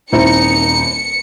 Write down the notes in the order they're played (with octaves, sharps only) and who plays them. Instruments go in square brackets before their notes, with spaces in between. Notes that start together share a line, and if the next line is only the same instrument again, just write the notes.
[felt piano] D#1 C4 E4 [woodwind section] D#4 [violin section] C#7